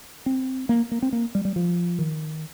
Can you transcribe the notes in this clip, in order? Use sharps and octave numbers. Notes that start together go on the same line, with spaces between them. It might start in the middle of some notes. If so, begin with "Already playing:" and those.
C4
A#3
A#3
C4
A#3
G3
G3
F3
D#3